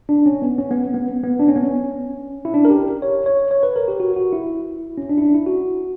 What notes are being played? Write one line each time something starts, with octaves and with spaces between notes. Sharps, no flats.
D4
C#4
B3
C#4
B3
B3
B3
D4
C#4
B3
C#4
E4
D4
A#4
G4
C#5
C#5
C#5
B4
A#4
G4
F#4
F#4
E4
C#4
D4
E4
D4
E4
F#4